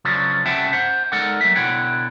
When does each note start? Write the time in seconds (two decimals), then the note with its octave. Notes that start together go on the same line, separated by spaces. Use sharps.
0.05 C#3 F3 F#3 C#4 D4
0.46 C2 C#4 E5 F#5 G5 A5
0.73 C5 F#5
1.12 G#3 D#4 A4 A#4 D5 F#5
1.41 F#3 A#3 E5
1.56 B2 D3 E4 C#5 F#5 G5